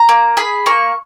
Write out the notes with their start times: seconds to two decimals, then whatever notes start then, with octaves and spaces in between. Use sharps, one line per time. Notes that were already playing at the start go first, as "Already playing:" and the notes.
Already playing: A#5
0.09 A#3
0.37 G#4 B5
0.66 A#3 C#6